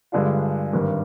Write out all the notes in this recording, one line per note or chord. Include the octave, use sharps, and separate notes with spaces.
G2 D3 G#3 D4 F4
G#1 G2 D#3